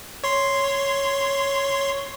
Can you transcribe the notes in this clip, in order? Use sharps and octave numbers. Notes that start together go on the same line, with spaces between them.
C#5 C6